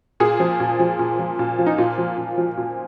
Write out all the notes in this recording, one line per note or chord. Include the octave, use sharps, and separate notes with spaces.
A#2 G#4
F3
A#2
F3
A#2
F3
A#2
F3
D#4
A#2 F4
F3
A#2
F3
A#2